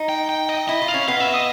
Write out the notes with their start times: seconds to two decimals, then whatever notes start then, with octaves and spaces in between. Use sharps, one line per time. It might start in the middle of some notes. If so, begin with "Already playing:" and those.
Already playing: D#4
0.09 G5
0.29 G5
0.49 D#5
0.68 E4 D#5
0.82 F4
0.88 F5
0.94 C#4
1.08 B3 F5
1.16 D#5
1.20 E5
1.34 D#5